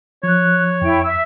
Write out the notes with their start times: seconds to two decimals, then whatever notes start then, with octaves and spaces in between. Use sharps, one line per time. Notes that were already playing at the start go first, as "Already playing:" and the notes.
0.23 F3 C#5 F#6
0.82 F2 E4 G5
1.04 E5 E6